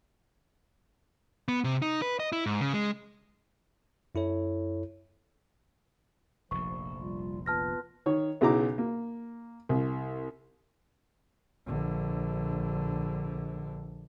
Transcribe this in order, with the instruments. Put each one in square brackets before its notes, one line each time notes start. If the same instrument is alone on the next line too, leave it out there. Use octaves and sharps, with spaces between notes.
[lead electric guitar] B3
C3
D#4
B4
D#5
E4
G#2
C#3
G#3
[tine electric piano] F#2 E4 A4 C#5
[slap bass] F1 A#1 [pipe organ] F3 [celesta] C#6
[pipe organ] G3 F4
[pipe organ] B3 F4 B4 [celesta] A5 F6 A#6
[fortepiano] D#3 C#5
B1 C#3 E4 A#5 D6
A#3
C2
[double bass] A#1 D3